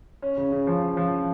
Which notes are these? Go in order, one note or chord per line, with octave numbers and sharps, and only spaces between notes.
C#4
C#3
C#3
F3
C#4
F3